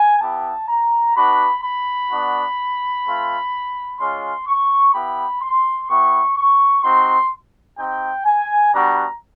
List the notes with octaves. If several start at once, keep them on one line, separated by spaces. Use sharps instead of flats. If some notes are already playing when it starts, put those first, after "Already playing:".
Already playing: G#5
B3 E4 G4 A5
A#5
B3 D4 F#4 B5
B5
B3 D4 F#4
A3 C4 F4
G#3 C#4 F4 C6
C#6
B3 E4 G4 B5
C6
B3 E4 G4 C#6
C#6
C4 D#4 F#4 C6
C4 D#4 G4 G5
G#5
G3 B3 D4 F#4 A#5